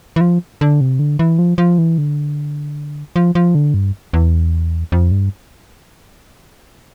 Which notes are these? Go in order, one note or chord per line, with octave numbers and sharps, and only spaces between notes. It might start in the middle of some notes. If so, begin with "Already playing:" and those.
E3
F3
D3
C3
D3
E3
F3
F3
E3
D3
F3
F3
D3
G2
E2
F2
G2